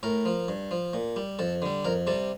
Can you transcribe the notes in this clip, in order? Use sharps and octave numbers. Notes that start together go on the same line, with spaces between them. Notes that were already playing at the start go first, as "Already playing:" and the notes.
A2 A#4
F3
G2
F3
A#2
G3
F2 A4
D3 G3
F2 A#4
C3 G3 A4